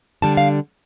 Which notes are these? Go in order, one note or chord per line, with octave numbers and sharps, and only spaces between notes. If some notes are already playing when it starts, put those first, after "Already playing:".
D3 G3 D4 A5
F5